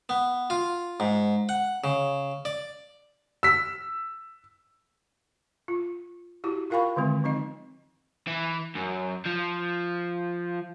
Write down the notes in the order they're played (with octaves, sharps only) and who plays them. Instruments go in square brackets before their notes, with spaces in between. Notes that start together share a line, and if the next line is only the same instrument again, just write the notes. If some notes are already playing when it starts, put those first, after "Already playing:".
[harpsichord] B3
F4
G#2
F#5
C#3
D5
[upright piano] E6 B6
[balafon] F4
E4 F#4 G4
F4 A#4 F5 G5 B5 C#6
D3 D#3 G#3 C4
F3 C4 D#4 D#5
[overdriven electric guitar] E3
F#2
F3